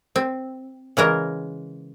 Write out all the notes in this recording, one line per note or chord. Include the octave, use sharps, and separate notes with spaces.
C4
C#3 E3 G#3 A#4